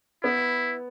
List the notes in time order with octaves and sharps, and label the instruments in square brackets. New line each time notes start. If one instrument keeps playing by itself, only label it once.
[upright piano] B3 [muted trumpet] E4